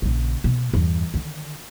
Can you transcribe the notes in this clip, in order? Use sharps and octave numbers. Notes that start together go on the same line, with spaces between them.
A#1 C#3
B2
E2 G2
D3 D#3